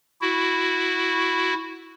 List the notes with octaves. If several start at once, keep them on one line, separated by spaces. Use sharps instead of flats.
E4 F#4